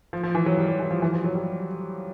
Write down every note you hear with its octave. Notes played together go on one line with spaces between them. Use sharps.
F3
F3
E3
F#3
G3
F#3
E3
F3
E3
F3
F#3
G3